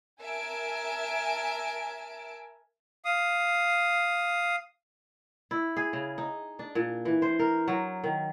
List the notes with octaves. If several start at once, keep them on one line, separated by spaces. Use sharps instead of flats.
A#4 E5 G#5 A5 D7
F5 D#6
E4
G#4
C#3
D#4
D4
A#2
E3
C5
A#4
F#3
D#3